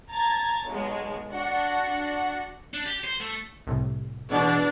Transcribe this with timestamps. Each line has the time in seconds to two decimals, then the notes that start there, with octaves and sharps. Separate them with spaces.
0.10 A5 A#5 G#6 A6
0.67 B1 G#3
1.32 D4 F#4 F#5
2.74 D4
2.86 G4
3.04 C5
3.21 A3
3.67 C2 A2 C3
4.30 E2 B2 B3 D4 D5